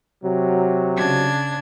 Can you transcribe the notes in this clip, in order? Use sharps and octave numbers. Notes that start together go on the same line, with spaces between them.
C3 F#3
C#3 D4 G#6